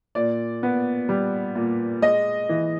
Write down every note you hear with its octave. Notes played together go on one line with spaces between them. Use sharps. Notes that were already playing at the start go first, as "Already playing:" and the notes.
A#2 D5
B3
G3
A#2
G#3 D#5
E3